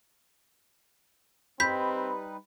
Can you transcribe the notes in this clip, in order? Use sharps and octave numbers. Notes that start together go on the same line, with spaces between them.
G3 C4 D#4 B4 B5 G6 B6